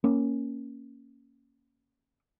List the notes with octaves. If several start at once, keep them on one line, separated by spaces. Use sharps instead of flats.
A#3 C#4